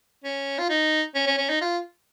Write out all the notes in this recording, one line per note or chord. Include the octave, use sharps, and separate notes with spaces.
C#4
F4
D#4
C#4
C#4
C#4
D#4
F4